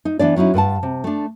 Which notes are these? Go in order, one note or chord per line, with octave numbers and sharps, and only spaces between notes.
D#4
E3 B3 D4 D5
F#3 C#4 D#4 E4
G2 B4 F#5 A5
C3
A3 D4